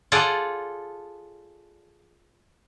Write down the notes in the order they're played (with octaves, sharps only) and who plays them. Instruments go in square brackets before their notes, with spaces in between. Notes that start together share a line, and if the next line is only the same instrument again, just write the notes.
[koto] F4 G#4 A4 D5 F#5